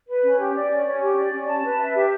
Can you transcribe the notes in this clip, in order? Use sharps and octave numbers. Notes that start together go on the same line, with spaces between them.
B4
C#4
G4
D5
C#4
C#4
G4
D5
C#4
A5
B4
E5
G4